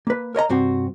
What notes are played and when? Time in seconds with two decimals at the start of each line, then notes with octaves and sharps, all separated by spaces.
0.07 A#3 B4
0.35 A#4 C#5 D#5 A#5
0.49 G2 C3 C4 F#4